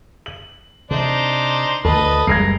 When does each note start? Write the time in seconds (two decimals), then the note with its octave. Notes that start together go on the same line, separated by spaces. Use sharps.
0.26 F#7
0.91 C3 D4 D#4 C5
1.85 D2 D3 A4 B4 D#5 A5
2.27 F#1 G3 G#3 A#4 G#6 A#6 C7